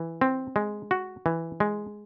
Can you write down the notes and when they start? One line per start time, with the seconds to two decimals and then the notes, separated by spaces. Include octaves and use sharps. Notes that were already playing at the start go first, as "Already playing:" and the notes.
Already playing: E3
0.21 C4
0.56 G#3
0.91 F#4
1.26 E3
1.60 G#3